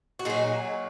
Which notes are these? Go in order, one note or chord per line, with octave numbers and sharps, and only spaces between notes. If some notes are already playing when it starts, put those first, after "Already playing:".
F#4
A#2 F#3 D#4 G#4